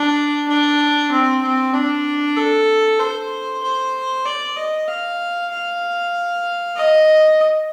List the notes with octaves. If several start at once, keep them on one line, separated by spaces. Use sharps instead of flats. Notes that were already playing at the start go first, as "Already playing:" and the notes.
Already playing: D4
D4
C4
C4
D4
A4
C5
C5
D5
D#5
F5
F5
D#5